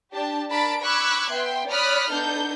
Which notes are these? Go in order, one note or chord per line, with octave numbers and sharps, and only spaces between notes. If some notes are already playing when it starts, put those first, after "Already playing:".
D4 G4 A5
D4 A#4 A5 B5 B6 D7
B5 C#6 D6 E6 F#6 G#6
B3 E5 G5 C6
C#5 D5 B5 D#6 F6 F#6
B3 D4 D#4 A4 G6